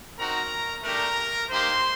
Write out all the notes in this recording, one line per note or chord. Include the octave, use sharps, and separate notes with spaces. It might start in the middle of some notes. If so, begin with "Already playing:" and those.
C4 D#4 F#4 A#4 A#5
A3 D4 G4 A#4 A#5
A#3 D#4 G4 C5 C6